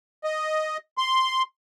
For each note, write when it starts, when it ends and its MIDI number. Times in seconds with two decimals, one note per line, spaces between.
0.24 0.77 75
0.98 1.43 84